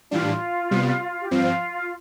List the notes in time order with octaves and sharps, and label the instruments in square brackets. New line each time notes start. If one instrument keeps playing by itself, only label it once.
[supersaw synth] A2 E3 G3 D4 [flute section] F4
[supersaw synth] C3 G3 B3
[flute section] G4
[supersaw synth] G2 F3 C4 [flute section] F4